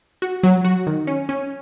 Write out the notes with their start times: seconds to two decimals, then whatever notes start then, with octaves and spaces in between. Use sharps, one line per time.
0.22 F#4
0.43 F#3
0.65 F#4
0.87 D#3
1.07 C#4
1.29 C#4